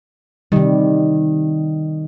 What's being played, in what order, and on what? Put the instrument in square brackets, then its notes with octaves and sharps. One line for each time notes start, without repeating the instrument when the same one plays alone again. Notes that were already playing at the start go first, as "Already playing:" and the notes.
[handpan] C3 G3 [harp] D#3